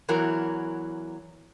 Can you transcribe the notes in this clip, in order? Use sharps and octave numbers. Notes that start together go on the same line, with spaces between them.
E2 E3 F#3 A#4